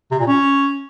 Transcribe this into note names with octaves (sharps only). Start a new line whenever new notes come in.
C3
A#2
C#4